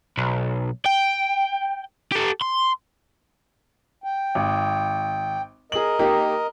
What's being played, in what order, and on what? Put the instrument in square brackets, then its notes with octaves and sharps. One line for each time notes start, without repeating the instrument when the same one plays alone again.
[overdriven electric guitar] B1
G5
G4 A4
C6
[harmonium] G5
[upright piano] G#1
[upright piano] G#4 F#7 [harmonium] A#4 D#5
[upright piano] A#3 D#4 G4